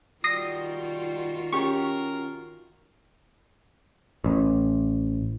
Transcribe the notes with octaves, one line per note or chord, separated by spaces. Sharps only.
D#3 G3 F4 F#4 D#6 A#6 C7
C#4 G4 A#4 C#6
A1